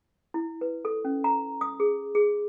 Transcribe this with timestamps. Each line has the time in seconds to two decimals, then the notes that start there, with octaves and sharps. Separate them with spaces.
0.34 E4
0.61 B4
0.85 A4
1.05 C#4
1.24 A#5
1.61 D#6
1.80 G#4
2.15 G#4